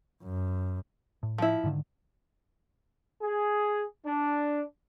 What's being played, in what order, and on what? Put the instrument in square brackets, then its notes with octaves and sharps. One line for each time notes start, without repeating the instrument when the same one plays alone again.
[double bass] F#2
[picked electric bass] A2
[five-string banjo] F3 E4
[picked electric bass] G#2 D3 D#3
[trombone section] G#4
D4